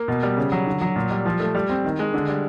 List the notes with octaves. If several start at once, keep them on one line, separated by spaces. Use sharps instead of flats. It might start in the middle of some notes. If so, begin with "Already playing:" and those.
Already playing: A#3
B2
G3
C#3
F#3
D3
F#3
A#2
G3
F3
A3
G3
C4
D#3
G#3
D3
G3